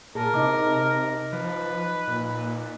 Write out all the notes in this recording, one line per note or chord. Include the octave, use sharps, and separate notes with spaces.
A#2 G#4 A#4 A5
C3 D#4 D#5 D6
F3 B4
A#2